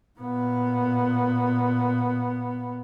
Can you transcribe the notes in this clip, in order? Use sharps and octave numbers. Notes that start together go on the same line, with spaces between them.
A#2 B3